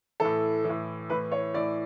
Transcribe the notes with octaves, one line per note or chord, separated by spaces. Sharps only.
A2 E3 A4
E3
A2
A2 E3 B4
C#5
A2 E3 D5